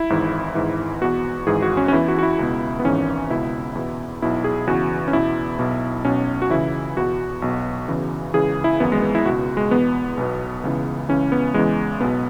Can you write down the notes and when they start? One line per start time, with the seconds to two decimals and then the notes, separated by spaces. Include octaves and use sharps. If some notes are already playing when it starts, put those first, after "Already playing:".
Already playing: E4
0.10 G#1 G#2 E3
0.55 G#1 G#2 E3
1.01 E2 B2 F#4
1.47 G#1 G#2 E3 G#4
1.62 F#4
1.77 C#4
1.88 C#4
1.92 E2 E3 E4
2.08 F#4
2.19 F#4
2.23 E4
2.39 C#2 B2
2.79 B3
2.85 G#1 G#2 E3 C#4
3.30 C#2 B2 E4
3.75 E2 B2
4.22 B1 B2 E4
4.44 G#4
4.67 E2 C#3 E3 F#4
5.08 C#4
5.13 E2 B2 E4
5.59 B1 B2
6.05 B1 B2 C#4
6.42 F#4
6.50 C#2 C#3 E3 E4
6.97 E2 B2 F#4
7.42 B1 B2
7.88 E2 C#3 E3
8.34 C#2 C#3 E3 G#4
8.64 E4
8.80 G#1 F#2 E3 B3
8.92 G#3
9.02 B3
9.15 E4
9.25 C#2 B2 F#4
9.57 G#3
9.71 E2 B2 B3
10.17 B1 B2
10.64 C#2 C#3 E3
11.09 C#2 C#3 E3 C#4
11.32 B3
11.54 E2 C#3 E3 G#3
12.01 B1 B2 B3